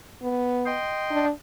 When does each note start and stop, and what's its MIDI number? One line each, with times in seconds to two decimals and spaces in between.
0.23 0.77 59
0.66 1.25 75
0.66 1.25 79
0.66 1.25 84
1.11 1.30 62